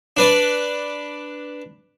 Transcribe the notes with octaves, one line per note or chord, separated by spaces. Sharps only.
D4 B4 D5